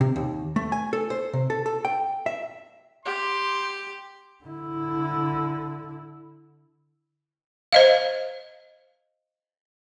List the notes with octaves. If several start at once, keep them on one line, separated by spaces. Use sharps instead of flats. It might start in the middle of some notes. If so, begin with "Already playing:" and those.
C3
D#2
A3
G#5
A4
C5
C3
A4
A4
G5
E5
G4 C6
D3 E4
C5 D#5 F5